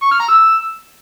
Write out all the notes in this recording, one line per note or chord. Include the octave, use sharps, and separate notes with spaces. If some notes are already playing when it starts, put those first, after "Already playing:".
C#6
F6
A#5
E6